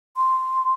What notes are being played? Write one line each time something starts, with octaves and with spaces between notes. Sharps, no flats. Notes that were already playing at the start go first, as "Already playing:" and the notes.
C6